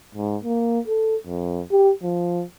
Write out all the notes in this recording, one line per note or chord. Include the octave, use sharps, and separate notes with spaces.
G#2
A#3
A4
F2
G4
F3